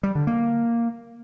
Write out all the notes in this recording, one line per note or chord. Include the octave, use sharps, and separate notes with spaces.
G3
D3
A#3